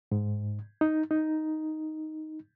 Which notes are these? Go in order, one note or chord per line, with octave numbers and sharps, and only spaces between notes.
G#2
D#4
D#4